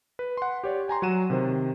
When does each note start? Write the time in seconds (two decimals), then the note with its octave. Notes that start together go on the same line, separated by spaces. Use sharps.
0.19 B4
0.37 F#5 C6
0.64 G4 C#5 D5
0.88 G5 G#5 A#5 C6
1.02 F#3 F#4 F#5 D#7 E7
1.30 C3 D#3 C5